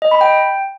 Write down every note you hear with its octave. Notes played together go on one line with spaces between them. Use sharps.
D#5
B5
G5